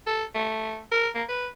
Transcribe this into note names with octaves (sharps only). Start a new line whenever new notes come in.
A4
A3
A#4
A#3
B4